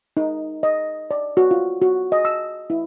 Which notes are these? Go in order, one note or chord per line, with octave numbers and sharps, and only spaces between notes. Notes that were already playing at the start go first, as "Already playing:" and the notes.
D#4
D#5
D5
F#4
F4
F#4
D#5
E6
E4